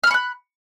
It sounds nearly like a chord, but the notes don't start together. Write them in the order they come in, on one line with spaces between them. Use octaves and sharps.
F6 B5 C#6 F#6